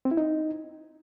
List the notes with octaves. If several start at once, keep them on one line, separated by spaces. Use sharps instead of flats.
C4
E4
D#4